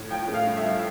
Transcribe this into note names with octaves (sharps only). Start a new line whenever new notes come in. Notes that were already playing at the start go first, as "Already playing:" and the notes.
Already playing: A2
F3 G5
A3
F5
G2
E5
F3